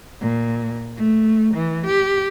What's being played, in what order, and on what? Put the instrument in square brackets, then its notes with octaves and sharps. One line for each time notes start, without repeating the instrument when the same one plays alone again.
[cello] A#2
A3
E3
G4